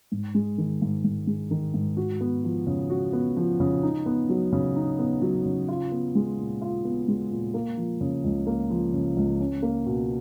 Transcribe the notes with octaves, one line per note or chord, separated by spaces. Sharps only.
G#2
G#3
D#3
G#2
G#2
G#3
D#3
G#2
F#4
B3
F3
C#3
F#4
B3
F3
C#3
D#4
B3
F#3
C#3
D#4
B3
F#3
C#3
F4
B3
G#3
A#2
F4
B3
G#3
A#2
A#3
F3
C#3
C#2
A#3
F3
C#3
C#2
C#4
A#3
B2